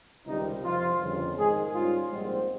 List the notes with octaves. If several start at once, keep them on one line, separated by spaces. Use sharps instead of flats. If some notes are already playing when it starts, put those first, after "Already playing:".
C#2 C3 D#3 G3 D#4
F2 C3 F3 F4
G1 F2 C#3
G#2 D#3 G#3 G#4
G#2 G3 C#4 F4
A#1 G#2 G3 C4